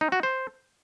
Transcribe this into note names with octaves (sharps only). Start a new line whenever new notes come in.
D#4
F#4
C5